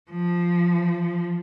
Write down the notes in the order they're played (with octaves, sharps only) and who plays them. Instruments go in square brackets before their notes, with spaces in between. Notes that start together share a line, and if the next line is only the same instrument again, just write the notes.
[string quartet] F3